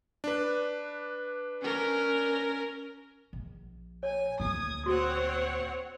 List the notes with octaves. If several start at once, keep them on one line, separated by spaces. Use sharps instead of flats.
D4 B4
C#4 A#4
A#1
C#5 G#5
D2 A#2 D#6 G#6
C4 F#4 C#5 F#5